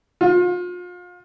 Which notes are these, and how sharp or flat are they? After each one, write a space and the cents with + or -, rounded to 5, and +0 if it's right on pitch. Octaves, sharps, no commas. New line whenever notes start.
F4 +35